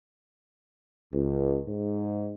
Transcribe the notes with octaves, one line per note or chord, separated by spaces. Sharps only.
C#2
G#2